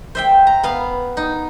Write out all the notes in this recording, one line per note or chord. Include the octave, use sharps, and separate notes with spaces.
C5 E5 G5
A#5
B3 F5
D#4